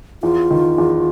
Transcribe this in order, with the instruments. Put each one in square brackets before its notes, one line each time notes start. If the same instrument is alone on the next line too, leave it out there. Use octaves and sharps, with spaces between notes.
[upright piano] E2 [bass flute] F4
[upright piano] D#3
E2